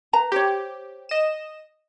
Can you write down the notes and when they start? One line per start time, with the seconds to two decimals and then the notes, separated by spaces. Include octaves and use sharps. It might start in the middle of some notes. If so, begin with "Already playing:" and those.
0.13 B4 A#5
0.32 G4 C5 C#5
1.09 D#5 E7